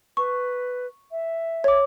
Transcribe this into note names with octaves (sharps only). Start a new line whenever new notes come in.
B4 C#6
E5
C#5 D6